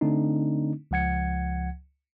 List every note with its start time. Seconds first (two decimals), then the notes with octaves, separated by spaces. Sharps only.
0.01 D3 A3 C4 D4 D#4
0.91 C#2 F3 F#5 G#6 C#7